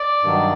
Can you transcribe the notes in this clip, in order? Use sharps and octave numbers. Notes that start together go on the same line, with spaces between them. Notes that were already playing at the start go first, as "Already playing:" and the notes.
Already playing: D5
G2 D#3 F#3